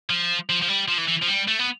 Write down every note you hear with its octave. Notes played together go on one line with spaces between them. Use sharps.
F3
F3
F3
G3
F3
E3
E3
F3
G3
A3
B3